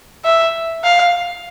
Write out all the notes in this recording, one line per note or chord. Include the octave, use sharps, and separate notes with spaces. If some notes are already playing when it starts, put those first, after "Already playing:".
E5
F5